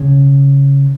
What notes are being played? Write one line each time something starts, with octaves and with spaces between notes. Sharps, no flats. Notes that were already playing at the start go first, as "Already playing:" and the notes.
Already playing: C#3